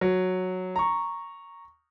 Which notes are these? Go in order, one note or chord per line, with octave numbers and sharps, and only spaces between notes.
F#3
A#5 C#6